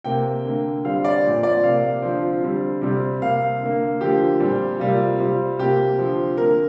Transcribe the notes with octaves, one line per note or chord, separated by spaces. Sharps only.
C3 A#3 G5
D3 A#3
D3 G3 C4 F5
D5
A#2 F3 C4
D5
C3 A#3 F5
D3 F3 C4
D3 G3 C4
C3 G3 C4
C3 A#3 F5
D3 A#3
D3 F3 A#3 G4
A#2 G3 C4
C3 G3 A#3 F4
C3 G3 C4
C3 A#3 G4
D3 F3 C4
D3 A#3 A#4